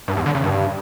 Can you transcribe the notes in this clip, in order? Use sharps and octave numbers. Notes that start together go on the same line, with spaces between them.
G2
E2
D3
C#3
G2